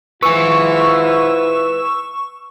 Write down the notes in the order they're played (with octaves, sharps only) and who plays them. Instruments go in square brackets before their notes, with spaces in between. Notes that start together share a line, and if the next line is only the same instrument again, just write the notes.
[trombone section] G#2 E4 F4 [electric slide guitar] B4 G#5 [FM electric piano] C#6 [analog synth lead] E6